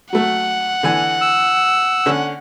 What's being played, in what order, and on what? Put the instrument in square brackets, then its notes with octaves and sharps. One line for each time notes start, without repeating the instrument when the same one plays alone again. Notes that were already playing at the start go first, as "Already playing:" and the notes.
[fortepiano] F#3 A3 [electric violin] F#5
[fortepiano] D3 E3 G#5
[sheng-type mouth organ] E6
[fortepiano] D3 C#4